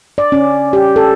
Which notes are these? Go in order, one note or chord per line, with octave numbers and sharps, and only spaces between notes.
D5
C#4
G4
A4